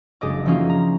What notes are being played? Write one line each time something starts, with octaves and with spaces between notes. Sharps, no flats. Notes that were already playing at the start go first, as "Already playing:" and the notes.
F#1 G#3 D4 D#5 D6
E3 F3 A#3 C#4 D#4 F4
A#5